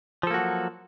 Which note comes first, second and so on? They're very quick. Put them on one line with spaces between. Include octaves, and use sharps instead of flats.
F3 A4 A#3 F#4 F#3